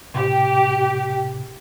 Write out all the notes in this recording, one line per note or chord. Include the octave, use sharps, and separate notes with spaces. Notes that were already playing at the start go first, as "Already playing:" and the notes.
A2 C3 G4